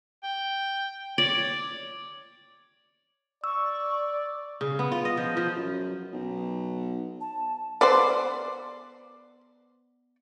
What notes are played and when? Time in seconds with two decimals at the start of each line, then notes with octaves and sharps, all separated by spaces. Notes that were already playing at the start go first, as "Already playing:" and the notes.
0.23 G5
1.18 C#5 D5
3.44 D5 C#6 E6
4.61 C#3
4.79 B3
4.92 F4
5.05 D#5
5.17 F3
5.37 F3
5.56 F#2
6.13 B1
7.21 A5
7.81 B3 B4 C5 D5